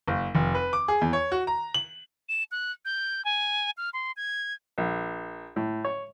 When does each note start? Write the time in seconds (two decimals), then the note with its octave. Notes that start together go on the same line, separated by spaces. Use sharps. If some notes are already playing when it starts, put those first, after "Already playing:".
0.08 F#1
0.35 F1
0.55 B4
0.73 D6
0.88 G#4
1.01 E2
1.13 C#5
1.32 F#4
1.47 A#5
1.74 F#7
2.29 E7
2.52 F#6
2.85 G6
3.25 G#5
3.77 F6
3.93 C6
4.17 G#6
4.78 A#1
5.56 A2
5.85 C#5